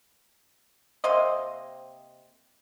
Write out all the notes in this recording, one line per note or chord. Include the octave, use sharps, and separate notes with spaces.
C3 A#3 C5 D#5